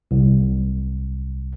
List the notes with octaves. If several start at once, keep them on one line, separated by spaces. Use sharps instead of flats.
C2